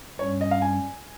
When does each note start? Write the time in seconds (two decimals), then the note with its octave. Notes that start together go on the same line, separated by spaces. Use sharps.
0.19 G2 G3 C#4 C#5
0.41 D#5
0.51 F5
0.62 G#5